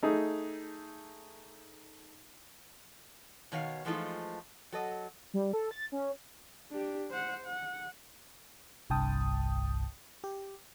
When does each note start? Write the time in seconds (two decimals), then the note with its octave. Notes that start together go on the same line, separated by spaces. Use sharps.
0.03 A3 D#4 G#4
3.52 B2 D#3 C#5 F5
3.85 E3 F3 G#3 A3 D#4 F4
4.72 F#3 A4 D#5
5.34 G3
5.53 A4
5.71 A6
5.92 C#4
6.71 D4 G4
7.11 C5 F#5
7.46 F#5
8.90 G1 C2 G2 G5 A5 D#6
10.24 G4